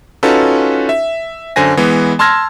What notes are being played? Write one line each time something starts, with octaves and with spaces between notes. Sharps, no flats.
C#4 D#4 F4 F#4 A4 B4
E5
F#2 D3 C5 G#5 A#6
E3 G#3 B3
A5 C6 E6 F6 G#6 A#6